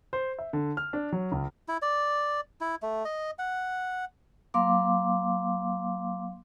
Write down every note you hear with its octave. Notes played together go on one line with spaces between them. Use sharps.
C5
E5
D3
F6
D4
F#3
C#2
E4
D5
E4
A3
D#5
F#5
F#3 A#3 F5 C6 D6